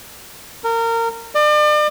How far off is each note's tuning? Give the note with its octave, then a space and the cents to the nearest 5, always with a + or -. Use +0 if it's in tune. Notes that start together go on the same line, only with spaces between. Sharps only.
A#4 -25
D5 +40